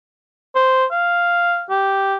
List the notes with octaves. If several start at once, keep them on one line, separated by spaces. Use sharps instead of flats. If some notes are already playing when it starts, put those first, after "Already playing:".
C5
F5
G4